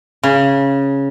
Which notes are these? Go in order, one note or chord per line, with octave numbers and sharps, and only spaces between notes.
C#3